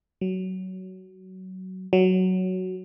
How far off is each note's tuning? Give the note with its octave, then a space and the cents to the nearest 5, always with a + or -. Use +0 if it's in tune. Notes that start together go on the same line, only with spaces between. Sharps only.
F#3 +15
F#3 +5